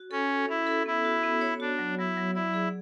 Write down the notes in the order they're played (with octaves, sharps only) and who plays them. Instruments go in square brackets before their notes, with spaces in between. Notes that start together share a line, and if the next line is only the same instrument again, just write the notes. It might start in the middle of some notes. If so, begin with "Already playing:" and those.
Already playing: [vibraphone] F#4
[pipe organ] C#4 [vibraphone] A4
[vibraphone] A4
[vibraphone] C#4 [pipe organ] E4
[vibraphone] A4
[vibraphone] B3 [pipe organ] E4
[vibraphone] F#4
B3
C#5
[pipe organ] D4 [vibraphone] F#4
[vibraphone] F#3
[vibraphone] F#3 [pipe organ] E4
[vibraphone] F#3
[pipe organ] E4 [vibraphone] D5
[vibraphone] G#4